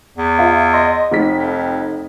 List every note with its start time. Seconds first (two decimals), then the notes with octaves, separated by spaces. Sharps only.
0.17 E2
0.39 F4 E5
0.74 D#5 C6
1.11 F1 D#4 B6
1.33 F2